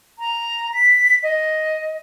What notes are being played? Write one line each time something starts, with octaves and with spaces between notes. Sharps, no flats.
A#5
B6
D#5